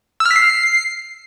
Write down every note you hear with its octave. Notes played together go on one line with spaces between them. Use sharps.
E6
F6
B6
C7